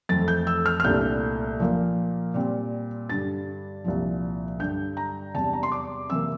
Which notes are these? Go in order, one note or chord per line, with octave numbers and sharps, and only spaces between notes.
F2 E3 A3 C4 A6
G6
E6
F6
F6
C2 A#2 A3 D4 G6
A#2 F3 A#3
A#2 G3 C4
G2 D3 G3 A6
C2 A#2 F3
G2 D3 G3 D4 G6
A#5
E2 C3 G3 A5
A#5
C6
D6
C3 E3 A#3 E6